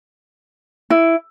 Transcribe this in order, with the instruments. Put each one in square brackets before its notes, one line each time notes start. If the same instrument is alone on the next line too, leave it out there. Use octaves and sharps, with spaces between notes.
[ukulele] E4